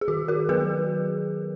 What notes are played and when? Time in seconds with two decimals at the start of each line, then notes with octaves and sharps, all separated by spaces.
0.01 G#4
0.08 D#3 F#4
0.28 F#4 A#4
0.49 F#3 B3 G#4 B4